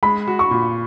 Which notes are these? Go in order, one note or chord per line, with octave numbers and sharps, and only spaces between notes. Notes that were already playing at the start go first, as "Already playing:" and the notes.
G#3 B5
F#4
C#6
A#2